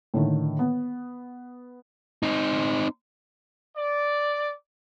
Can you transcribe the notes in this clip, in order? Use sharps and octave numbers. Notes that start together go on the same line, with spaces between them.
A2 D3 D#3
B3
C4 D#4
D5